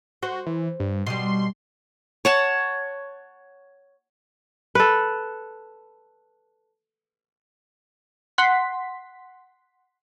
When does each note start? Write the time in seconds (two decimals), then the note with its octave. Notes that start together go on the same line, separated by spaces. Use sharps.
0.22 F#4 C5
0.46 E3
0.80 G2
1.07 B2 G3 C6
2.25 C#5 F#5 A5
4.75 A4 B4
8.38 F#5 C6 B6